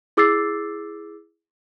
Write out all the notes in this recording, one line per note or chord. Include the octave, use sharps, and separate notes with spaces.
E4 G#4 D6 E6 A6 C7